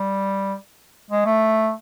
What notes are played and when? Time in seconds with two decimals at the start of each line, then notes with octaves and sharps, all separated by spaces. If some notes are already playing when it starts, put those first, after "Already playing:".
Already playing: G3
1.10 G#3
1.25 A3